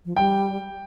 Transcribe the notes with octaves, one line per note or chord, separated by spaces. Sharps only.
F3
G3 G5